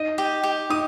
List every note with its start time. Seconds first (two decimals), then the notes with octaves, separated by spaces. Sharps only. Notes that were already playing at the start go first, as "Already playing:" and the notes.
Already playing: D#4 D#5
0.18 G4
0.43 G4
0.70 D#4 D#6